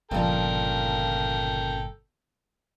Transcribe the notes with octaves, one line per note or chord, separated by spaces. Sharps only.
G1 G2 A#2 C#3 F3 A4 A#4 G5